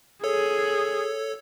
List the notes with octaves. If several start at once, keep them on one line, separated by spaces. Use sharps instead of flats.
G#4 A4 C#5